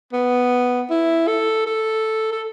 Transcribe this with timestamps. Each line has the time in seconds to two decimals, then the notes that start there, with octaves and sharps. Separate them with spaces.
0.13 B3
0.90 E4
1.27 A4
1.66 A4
2.32 A4